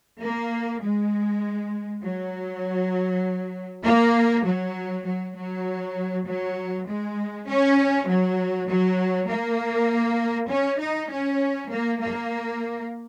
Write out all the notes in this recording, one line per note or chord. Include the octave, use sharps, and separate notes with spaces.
A#3
G#3
F#3
A#3
F#3
F#3
F#3
F#3
G#3
C#4
F#3
F#3
A#3
C#4
D#4
C#4
A#3
A#3